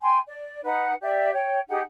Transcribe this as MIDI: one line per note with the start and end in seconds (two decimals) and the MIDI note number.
0.01 0.18 79
0.01 0.18 80
0.01 0.18 84
0.26 0.62 74
0.63 0.93 63
0.63 0.93 71
0.63 0.93 78
1.01 1.31 67
1.01 1.31 74
1.01 1.31 76
1.32 1.60 73
1.32 1.60 79
1.68 1.80 63
1.68 1.80 67
1.68 1.80 68
1.68 1.80 78